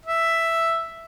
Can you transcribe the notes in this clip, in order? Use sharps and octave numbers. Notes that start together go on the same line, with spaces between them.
E5